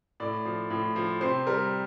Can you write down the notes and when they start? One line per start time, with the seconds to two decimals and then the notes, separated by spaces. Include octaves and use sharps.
0.20 A2 D5
0.45 F3
0.70 A2
0.96 F3
1.21 C3 C5
1.47 G3 A#4